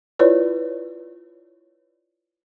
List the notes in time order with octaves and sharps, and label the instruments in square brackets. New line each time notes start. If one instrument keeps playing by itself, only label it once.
[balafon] E4 F4 B4 C#5 D5